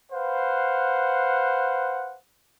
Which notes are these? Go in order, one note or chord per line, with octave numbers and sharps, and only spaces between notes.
B4 C5 F5 F#5